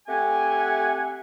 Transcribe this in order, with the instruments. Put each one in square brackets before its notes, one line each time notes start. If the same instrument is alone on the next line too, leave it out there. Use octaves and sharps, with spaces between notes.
[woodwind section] A3 C4 G4 F#5 G#5